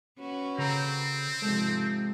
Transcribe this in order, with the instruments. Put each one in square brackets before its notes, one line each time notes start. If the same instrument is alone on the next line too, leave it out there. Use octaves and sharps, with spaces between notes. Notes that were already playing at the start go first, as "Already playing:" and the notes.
[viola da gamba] C#4 F#4 B4
[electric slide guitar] C#3 A4 A#5 [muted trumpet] C4
[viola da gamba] G#2 C3 F3 [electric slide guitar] G#3 A4